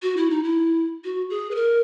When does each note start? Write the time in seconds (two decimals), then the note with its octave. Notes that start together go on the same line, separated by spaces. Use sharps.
0.02 F#4
0.17 E4
0.30 D#4
0.43 E4
1.04 F#4
1.30 G#4
1.51 B4
1.55 A#4